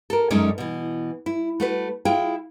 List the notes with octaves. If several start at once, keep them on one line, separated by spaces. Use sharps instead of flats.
A4 A#4
F#2 G#3 C#4 D#4 D5
B2 E3
E4
A3 F#4 B4
E4 F4 G#4 G5